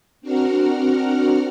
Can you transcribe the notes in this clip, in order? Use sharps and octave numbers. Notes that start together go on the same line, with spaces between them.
C4 D4 F#4 A#4 F#5 F6